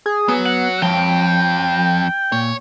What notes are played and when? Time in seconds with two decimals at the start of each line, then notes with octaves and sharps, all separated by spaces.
0.06 G#4
0.28 F#3 B3
0.45 F#5
0.82 F2 F3 C#5 G5
2.32 A#2 C#5